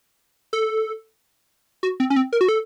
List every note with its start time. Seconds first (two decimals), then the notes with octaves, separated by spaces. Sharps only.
0.53 A4
1.83 F#4
2.00 C4
2.10 C#4
2.16 C4
2.33 A#4
2.41 F#4
2.49 A4